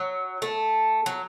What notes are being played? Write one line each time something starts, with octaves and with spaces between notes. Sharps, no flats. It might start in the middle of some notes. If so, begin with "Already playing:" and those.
Already playing: F#3
A3
F#3